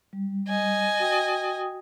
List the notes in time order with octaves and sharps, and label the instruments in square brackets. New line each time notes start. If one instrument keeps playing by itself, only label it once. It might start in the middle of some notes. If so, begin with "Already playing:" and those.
[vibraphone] G3
[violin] D#5 G#5
[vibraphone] F#4 G5 D#6